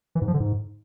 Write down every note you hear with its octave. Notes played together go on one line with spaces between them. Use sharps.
E3
G#2
F3
D3
G#2